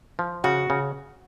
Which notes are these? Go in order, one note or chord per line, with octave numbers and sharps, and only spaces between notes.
F3
C#3 F#4
C#3